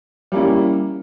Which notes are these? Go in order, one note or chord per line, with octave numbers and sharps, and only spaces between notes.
G3 A#3 C#4 E4